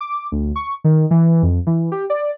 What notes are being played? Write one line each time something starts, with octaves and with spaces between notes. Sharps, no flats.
D6
D2
C#6
D#3
E3
F2
E3
G4
D5